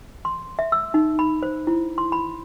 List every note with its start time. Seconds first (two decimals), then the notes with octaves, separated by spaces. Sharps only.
0.25 C6
0.59 E5
0.72 E6
0.94 D#4
1.19 B5
1.43 C5
1.67 E4
1.98 C6
2.12 B5